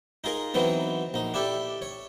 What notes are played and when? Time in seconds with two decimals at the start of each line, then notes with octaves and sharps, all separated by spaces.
0.24 D#4 F4 G#4 A#4
0.54 E3 F#3 B3 C4 D#4
1.14 A#1 D#4
1.34 D4 E4 G4 A4
1.82 C#5